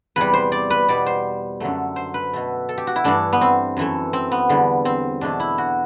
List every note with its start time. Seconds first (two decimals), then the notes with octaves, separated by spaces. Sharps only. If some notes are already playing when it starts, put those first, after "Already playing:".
0.16 E2 C3 G3 B4
0.34 C5
0.52 D5
0.70 B4
0.88 B2 G3 D5
1.06 C5
1.60 F#2 D3 F#3 A3
1.96 C5
2.14 B4
2.33 B2 A3
2.69 A4
2.78 G4
2.87 F#4
2.96 E4
3.04 G2 E3 A3 D4
3.33 B3
3.41 C4
3.77 F#2 E3 A3
4.13 C4
4.32 B3
4.49 E2 D3 G3
4.85 C4
5.21 E2 B2 A3 D4
5.40 E4
5.58 F#4